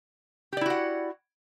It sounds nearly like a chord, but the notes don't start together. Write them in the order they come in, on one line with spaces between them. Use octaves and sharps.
G4 D5 E4 F#4 F#5